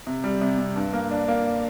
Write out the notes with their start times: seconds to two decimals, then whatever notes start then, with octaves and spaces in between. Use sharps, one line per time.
0.07 C3
0.24 G3
0.41 C3
0.58 C3
0.76 G2
0.93 A#3
1.11 D4
1.28 A#3